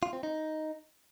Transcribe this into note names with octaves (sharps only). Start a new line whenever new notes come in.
F4
C4
D#4